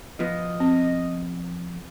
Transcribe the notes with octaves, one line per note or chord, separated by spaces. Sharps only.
F3 B3 D#5
C4